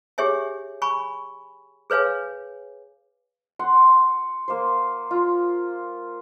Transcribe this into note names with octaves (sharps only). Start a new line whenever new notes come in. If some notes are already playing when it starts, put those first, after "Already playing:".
G4 G#4 C#5 E5 G#5
G#5 B5 C#6
G#4 B4 C#5 F5 G#5
F#5 C6
A#3 C5
F4